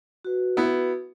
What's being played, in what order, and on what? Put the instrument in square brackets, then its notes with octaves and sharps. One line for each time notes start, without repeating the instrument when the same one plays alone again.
[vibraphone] F#4 B4
[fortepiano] B3 E4